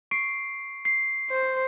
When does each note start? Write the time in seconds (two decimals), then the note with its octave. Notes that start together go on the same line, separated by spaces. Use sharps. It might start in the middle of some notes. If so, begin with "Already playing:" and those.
0.11 C#6 C7 D7
0.85 C7
1.31 C5